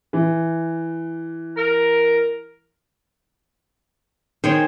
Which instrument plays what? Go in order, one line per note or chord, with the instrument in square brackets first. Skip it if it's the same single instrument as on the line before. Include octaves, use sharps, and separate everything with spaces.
[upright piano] E3
[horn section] A#4
[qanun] D#3 G#4 G5 [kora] C5 C#5